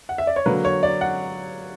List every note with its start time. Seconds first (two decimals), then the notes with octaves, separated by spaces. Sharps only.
0.09 F#5
0.18 E5
0.27 D5
0.36 C#5
0.46 D3 F#3 A#3 B4
0.65 C#5
0.83 D5
1.01 F#5